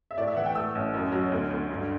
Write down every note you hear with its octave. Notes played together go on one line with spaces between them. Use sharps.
E5
A2 D5
E5
E3 F#5
G5
A3 E6
A1
F#2
F#3
D2
D2
G2